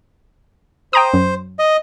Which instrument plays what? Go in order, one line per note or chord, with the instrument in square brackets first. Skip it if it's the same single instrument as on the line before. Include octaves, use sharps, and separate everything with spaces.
[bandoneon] C5 [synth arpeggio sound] G5 A#5 D#6
[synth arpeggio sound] F#2
[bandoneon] D#5